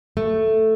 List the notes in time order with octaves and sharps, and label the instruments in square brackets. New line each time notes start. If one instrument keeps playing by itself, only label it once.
[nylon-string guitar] A3